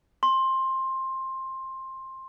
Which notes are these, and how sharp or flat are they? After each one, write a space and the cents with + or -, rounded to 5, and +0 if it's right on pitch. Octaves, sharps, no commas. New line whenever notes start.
C6 +15